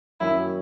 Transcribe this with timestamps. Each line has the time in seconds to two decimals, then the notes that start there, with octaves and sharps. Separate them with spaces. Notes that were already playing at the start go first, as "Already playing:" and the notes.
0.20 F#2 D#3 F#3 C#4 E4 F#4